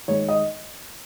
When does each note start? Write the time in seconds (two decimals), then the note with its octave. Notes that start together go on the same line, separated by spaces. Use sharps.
0.08 D#3 G#3 C#5
0.29 D#5